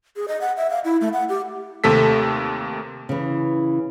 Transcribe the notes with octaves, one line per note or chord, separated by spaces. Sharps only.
G#4
D#5
F#5
E5
F5
E4
A3
F#5
G4
D#2 C3 A3 A4 B6
C#3 E3